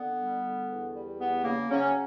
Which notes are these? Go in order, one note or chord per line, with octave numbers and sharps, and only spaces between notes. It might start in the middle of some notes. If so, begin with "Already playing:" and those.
Already playing: D3 B3
G3
D3
E2
G3
E2 B3
C#3 A#3
C#3 F#3 C#4